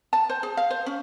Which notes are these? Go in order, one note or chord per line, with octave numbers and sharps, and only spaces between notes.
A5
C5
G#4
F5
C5
C#4